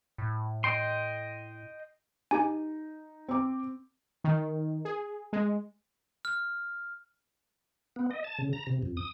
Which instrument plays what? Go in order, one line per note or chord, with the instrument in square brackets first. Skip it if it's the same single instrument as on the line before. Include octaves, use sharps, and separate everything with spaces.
[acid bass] A2
[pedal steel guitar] D#5 G5 C6
[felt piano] D#4 [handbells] G4 G#5
[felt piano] C4 D6
[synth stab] D#3
G#4
G#3
[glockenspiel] F6
[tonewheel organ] B3
D#5
A5
C#3
A#5
C3
F2
D#6